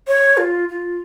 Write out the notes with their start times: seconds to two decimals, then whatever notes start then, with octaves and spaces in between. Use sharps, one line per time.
0.08 C#5
0.37 F4
0.69 F4